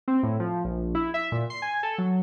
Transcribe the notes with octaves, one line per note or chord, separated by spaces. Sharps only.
C4
A2
F3
A#1
E4
E5
A#2
C6
G#5
A4
F#3